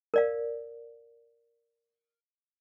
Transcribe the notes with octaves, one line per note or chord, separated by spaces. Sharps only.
A#4 D5 F5